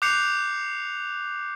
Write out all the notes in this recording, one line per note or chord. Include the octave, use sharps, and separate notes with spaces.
D6 F#6 G6 C7 C#7 F7